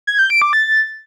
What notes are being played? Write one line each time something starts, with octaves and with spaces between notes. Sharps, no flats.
G#6
G6
D7
D6
A6